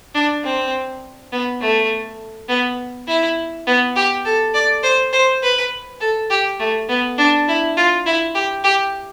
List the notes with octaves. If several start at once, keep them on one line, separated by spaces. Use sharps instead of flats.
D4
C4
B3
A3
B3
E4
B3
G4
A4
D5
C5
C5
B4
A4
G4
A3
B3
D4
E4
F4
E4
G4
G4